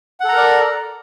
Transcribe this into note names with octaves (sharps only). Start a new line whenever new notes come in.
A4 A#4 D5 F#5 A#5